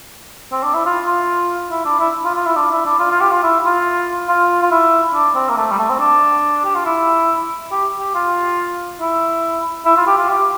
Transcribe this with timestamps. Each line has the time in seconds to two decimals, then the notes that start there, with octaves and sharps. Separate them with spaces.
0.52 C4
0.63 D4
0.74 E4
0.85 F4
1.06 F4
1.70 E4
1.85 D4
2.00 E4
2.25 F4
2.35 F4
2.46 E4
2.57 D4
2.71 E4
2.85 D4
2.99 F4
3.11 F4
3.21 G4
3.32 F4
3.43 E4
3.64 F4
4.28 F4
4.62 F4
4.71 E4
5.14 D4
5.35 C4
5.49 A#3
5.57 A3
5.71 G3
5.78 A3
5.90 C4
5.99 D4
6.65 G4
6.75 F4
6.85 E4
7.72 G4
7.98 G4
8.15 F4
9.00 E4
9.85 E4
9.97 F4
10.07 G4
10.18 F4
10.29 G4